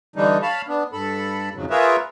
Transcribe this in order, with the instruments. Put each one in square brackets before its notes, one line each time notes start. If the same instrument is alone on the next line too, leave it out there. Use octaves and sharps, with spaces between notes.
[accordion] D3 E3 G3 D4 D#4
C#5 F5 A5 B5
B3 D4
G2 A4 B5
F2 G#2 C#3 F#3
F4 G#4 A#4 B4 C#5 E5